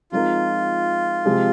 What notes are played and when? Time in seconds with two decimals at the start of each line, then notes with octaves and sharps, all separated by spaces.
0.12 F3 G#3 C4 D#4 F4 A#4
1.25 C3 F3 G#3 C4 G4